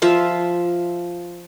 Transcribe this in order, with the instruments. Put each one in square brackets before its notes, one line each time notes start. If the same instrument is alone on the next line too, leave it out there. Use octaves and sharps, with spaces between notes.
[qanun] F3 F4 E5